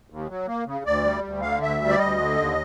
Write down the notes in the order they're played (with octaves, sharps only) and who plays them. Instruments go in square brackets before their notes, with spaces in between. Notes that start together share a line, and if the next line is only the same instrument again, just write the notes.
[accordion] D#2
F#3
A#3
C#3
D2 D5
G3
D2
D3 F5
D2 E5
G3
D5
D2 D#5
D3
D#2